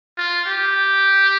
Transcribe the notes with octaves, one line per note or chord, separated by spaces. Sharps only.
F4
G4